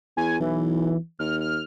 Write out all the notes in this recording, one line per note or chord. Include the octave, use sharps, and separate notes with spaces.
E2 G#5
B1 E3
D#2 F6
F6